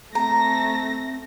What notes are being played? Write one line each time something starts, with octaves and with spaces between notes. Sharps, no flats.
A3 C4 A#5 A#6